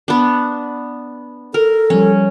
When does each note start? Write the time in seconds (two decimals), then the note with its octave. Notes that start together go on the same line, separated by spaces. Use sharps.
0.08 B3 D4
1.54 A4 A#4 F6
1.90 F3 G3 C#4